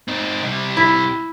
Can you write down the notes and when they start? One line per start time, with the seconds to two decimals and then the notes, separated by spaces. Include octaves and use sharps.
0.08 C4 D#4
0.42 C3 G3
0.77 E4